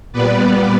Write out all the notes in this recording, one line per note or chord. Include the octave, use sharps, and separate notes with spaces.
A#2 G3 B3 B4 D5